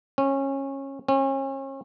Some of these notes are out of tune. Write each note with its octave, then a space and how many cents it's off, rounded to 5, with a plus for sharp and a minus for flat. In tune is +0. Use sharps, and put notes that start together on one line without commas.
C#4 -20
C#4 -35